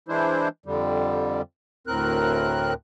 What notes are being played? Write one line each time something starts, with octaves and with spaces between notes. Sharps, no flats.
E3 G#3 D4 E4 C5
F2 D3 G3
D2 A2 C4 A#4 F#6